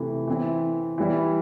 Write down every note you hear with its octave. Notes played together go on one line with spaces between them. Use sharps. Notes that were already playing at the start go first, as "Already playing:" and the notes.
Already playing: C3 E3 A3 E4
E3 C4 E4
E3 G3 E4